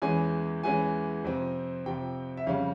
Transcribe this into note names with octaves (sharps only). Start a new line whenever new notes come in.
E2 E3 G#3 C#4 G#5
E2 E3 G#3 C#4 G#5
F2 C3 F3 C4
F2 C3 F3 C4 G5
E5
F2 C#3 G3 C#4 F5